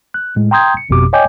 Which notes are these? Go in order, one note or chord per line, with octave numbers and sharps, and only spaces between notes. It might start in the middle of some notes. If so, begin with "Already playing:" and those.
F#6
A2 G#3
G5 A#5 C6 D#6 G6 G#6
C#7
G1 F2 B2 G4 D6
C#5 D#5 G5 G#5 D6 G6